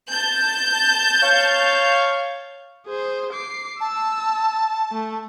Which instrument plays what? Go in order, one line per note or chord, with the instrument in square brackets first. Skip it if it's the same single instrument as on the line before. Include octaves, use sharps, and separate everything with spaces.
[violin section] A5 G6
[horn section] C#5 F5
[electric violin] G#4 C5
D6 C7
[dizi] A5 [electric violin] E6
[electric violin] A3